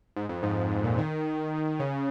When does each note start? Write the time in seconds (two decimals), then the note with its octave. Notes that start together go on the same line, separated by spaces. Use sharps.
0.16 G#2
0.29 F2
0.43 G#2
0.71 G#2
0.84 A#2
0.98 D#3
1.80 C#3